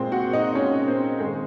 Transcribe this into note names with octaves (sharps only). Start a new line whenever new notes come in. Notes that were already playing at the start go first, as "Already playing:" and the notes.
Already playing: A#2 G#3 C4 C5
F#4 F#5
D#4 D#5
A#2 G#3 C#4 C#5
C4 C5
D#3 G#3 G#4